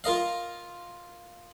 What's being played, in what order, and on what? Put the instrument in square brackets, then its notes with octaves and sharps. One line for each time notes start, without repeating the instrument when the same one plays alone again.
[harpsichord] F4 A#4 D#5 F5